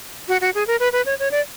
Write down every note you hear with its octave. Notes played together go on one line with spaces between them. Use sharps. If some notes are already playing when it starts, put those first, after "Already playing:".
F#4
F#4
G#4
A#4
B4
B4
C#5
C#5
D5